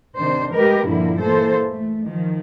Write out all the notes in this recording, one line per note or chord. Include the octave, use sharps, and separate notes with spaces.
C3 D#3 D4 C5
G#3 A3 G4 A#4 B4 D#5
G2 A#2 D3 F3 A#3 E4
E3 A#3 A4 C5
A3
D#3 F3